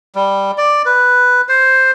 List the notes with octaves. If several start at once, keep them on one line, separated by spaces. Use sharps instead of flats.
G3
D5
B4
C5